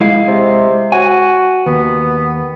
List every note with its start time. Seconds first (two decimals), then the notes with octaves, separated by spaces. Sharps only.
0.01 G#3 E4 F5
0.28 C3
0.92 F#4 G#5
1.66 D#2 B3